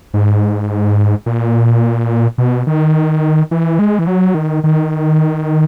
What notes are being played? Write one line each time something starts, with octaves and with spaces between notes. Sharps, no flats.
G#2
A#2
B2
D#3
E3
G#3
E3
F#3
D#3
D#3